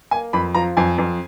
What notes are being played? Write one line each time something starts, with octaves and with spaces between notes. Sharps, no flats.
A#3 G#5
F2 B5
F3 A#5
F2 G#5
F2